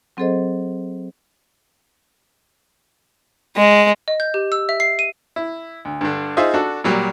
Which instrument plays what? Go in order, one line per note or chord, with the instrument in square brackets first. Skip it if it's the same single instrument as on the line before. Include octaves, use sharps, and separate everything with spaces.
[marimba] F#3 C4 G#4 A4 C5 D#5
[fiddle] G#3
[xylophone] D#5
G6
G4
E6
E5
C7
D#7
[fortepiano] E4
D2
G2 D3
D#4 F4 G#4 C5 E5
D4 F#4 A4
A#2 F#3 G3